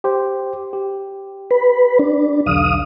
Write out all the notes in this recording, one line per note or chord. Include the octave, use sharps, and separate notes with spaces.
G4 C5
G4
B4
D4
B1 E2 D3 F5 D#6